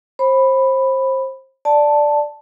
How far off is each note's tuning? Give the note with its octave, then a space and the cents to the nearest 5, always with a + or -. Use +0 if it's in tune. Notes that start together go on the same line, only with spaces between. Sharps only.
C5 +25 B5 +0
D5 +0 A5 +0